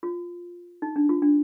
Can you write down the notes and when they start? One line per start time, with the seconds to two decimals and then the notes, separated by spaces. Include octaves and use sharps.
0.03 F4
0.82 D#4
0.96 D4
1.09 F4
1.22 D4